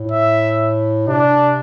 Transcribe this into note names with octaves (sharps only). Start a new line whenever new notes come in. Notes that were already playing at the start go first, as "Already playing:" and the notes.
Already playing: A2
E5
C3 D4